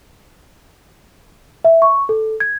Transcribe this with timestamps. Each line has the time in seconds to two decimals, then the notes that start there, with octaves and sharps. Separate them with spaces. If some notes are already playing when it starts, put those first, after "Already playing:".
1.65 E5
1.82 C#6
2.09 A4
2.40 G#6